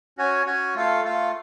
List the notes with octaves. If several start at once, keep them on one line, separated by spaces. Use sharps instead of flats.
C#4 F#4 C#5 G#5
C#4 F#4 C#5 G#5
A3 F4 A4 F5
A3 F4 A4 F5